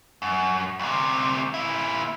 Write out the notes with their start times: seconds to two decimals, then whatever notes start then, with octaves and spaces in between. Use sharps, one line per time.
0.22 F#2
0.79 D2 C3
1.54 A#2 E4